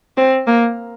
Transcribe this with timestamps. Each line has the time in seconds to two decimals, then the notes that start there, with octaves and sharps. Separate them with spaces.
0.17 C4
0.47 A#3